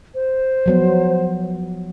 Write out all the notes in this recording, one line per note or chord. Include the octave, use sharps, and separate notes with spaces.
C5
F3 F#3 B3